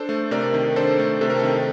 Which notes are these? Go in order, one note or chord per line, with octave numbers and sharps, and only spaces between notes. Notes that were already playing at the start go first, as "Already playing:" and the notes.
Already playing: D4 A4 C5
A3
C3 A#4 D5
D#3
D4 A4 C5
A3
C3 A4
A#4
D#3 A4